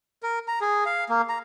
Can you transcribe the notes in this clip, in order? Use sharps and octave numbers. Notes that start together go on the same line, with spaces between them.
A#4
A#5
G#4
F5
A#3
A#5